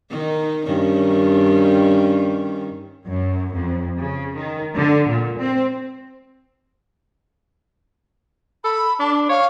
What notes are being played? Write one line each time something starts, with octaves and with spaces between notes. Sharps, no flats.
D#3 D#4
G2 D#3 C#4
F#2
F2
C#3
D#3
D3
A#2
C4
A4 B5
D4 A5
C#5 F5